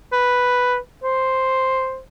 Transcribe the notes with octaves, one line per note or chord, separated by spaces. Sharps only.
B4
C5